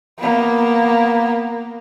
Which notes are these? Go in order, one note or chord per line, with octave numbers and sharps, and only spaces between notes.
A#3 B3